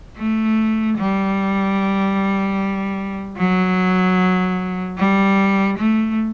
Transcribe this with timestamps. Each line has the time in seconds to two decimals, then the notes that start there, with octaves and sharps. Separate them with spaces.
0.17 A3
0.97 G3
3.37 F#3
4.97 G3
5.78 A3